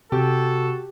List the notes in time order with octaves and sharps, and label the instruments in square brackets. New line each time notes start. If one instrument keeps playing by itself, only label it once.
[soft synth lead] C3 [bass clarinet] F#4 [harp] G4 [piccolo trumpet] A4